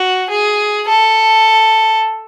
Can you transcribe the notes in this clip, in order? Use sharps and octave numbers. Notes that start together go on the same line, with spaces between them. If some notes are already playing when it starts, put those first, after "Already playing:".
Already playing: F#4
G#4
A4